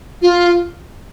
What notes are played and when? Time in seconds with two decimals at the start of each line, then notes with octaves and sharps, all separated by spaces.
0.22 F4